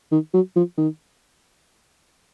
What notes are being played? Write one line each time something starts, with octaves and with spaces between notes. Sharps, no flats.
D#3
F#3
F3
D#3